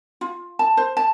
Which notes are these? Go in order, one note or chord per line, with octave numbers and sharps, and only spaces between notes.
F4
A5
C5
A5